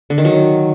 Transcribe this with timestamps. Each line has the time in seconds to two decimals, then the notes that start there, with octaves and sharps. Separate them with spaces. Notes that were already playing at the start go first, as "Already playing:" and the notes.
0.10 D3
0.18 D#3
0.25 F#3